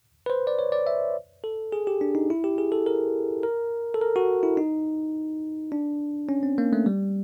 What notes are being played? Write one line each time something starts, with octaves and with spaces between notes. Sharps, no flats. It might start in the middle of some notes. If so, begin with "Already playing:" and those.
B4
C5
D5
C#5
D5
E5
A4
G#4
G4
D4
D#4
E4
G4
G#4
A4
A#4
A#4
A4
A#4
F#4
E4
D#4
D4
C#4
C4
A#3
A3
G3